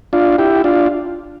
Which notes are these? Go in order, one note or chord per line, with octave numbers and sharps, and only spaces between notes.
D4 F4
E4 G4
D4 F4